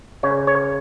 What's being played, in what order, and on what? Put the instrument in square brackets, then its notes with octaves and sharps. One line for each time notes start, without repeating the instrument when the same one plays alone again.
[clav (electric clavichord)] C#3 C#5
C#5